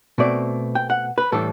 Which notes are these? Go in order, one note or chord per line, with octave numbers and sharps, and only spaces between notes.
B2 A3 C4 D5
G5
F#5
B4
A2 E3 G3 D4 A4